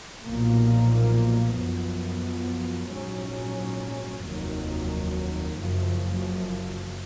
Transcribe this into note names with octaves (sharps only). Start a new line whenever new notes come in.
B1 A#2 F3 A#3
F#2 F3 B3
A#1 G#2 F#3 C#4
F1 D#2 D#3 F#3
F#1 F#2 F3